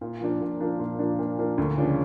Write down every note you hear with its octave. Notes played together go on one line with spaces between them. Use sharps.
A#2
F3 A#3 D4
A#2
F3 A#3 D4
A#2
F3 A#3 D4
A#2
F3 A#3 D4
D2
C#3 F3 A#3 D4